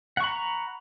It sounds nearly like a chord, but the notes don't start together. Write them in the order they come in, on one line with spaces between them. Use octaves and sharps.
F#5 C#6 B5 A#5